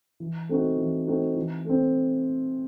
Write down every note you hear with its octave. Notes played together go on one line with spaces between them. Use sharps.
E3
A3 C4 D#4 F#4
E3
A3 C4 D#4 F#4
E3
A3 C4